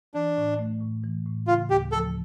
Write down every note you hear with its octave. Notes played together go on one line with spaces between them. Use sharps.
E3 D4
A2
A3
A2
E3
A2
C#3 F4
D2 G4
F3 A4